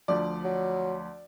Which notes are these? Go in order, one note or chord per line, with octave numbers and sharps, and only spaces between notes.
D2 F3 D5
F#3